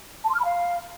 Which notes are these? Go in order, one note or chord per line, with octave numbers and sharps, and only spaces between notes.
A5
C6
F6
B5
F5